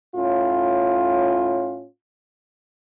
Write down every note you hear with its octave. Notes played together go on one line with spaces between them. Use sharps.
A2 C#4 F4